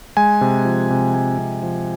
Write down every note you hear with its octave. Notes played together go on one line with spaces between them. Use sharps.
G#3 G#5
C3
F3
C3
G#3 G#5
C3
F3